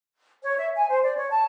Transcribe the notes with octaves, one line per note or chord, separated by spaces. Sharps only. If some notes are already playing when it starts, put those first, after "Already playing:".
C#5
E5
G#5
C5
D5
C#5
A5